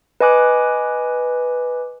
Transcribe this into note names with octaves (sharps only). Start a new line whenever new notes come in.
B4 D#5 G#5 D6 F#6